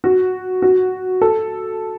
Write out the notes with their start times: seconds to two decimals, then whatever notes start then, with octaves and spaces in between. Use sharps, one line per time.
0.04 F#4
0.62 F#4
1.22 A4